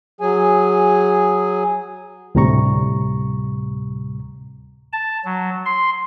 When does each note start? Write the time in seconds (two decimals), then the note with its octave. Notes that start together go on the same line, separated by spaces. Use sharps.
0.21 F#3 G#4 G#5
2.35 D2 A2 C3 G3 A#5 C#6
4.93 A5
5.25 F#3
5.65 C6